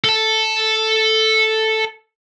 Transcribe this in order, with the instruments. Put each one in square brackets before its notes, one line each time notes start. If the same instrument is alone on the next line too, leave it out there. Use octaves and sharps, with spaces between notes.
[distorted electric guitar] A4 A5